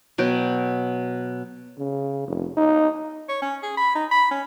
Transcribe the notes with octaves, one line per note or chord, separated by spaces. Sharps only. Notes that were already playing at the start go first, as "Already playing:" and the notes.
B2 F#3 G5
C#3
F1
D#4
C#5
C#4
G#4
B5
D#4
B5
C#4